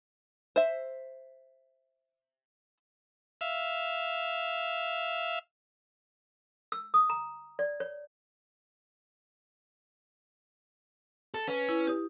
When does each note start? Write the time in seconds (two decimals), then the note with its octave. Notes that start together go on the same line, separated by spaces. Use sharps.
0.56 C5 E5
3.41 E5 F5
6.72 E6
6.94 D#6
7.10 A#5
7.59 D5
7.80 C#5
11.34 A4
11.48 C#4 B4
11.69 E4
11.87 G4 D#6